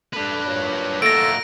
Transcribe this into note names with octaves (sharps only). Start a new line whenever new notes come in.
D4 A4 B4
A#2 F#3 C#5
D#3 F#3 A3 A#3 F#4 A4 A#6 D7